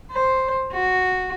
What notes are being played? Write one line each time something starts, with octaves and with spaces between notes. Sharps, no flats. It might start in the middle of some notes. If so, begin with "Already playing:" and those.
C5
F#4